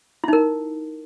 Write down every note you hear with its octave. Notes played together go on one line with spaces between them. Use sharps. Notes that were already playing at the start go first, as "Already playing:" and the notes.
D#4 E4 A#4